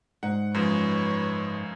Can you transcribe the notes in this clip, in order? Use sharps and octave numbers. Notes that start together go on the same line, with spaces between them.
G#2 F#5
F#2 F3 G#3 B4 C#5